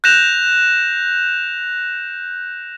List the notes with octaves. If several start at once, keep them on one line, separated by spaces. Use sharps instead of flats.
F#6 G6 A#6 E7 F7